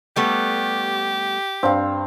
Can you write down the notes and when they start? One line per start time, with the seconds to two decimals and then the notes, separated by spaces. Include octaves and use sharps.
0.16 G3 A3 B3 G4
1.63 G2 C4 F5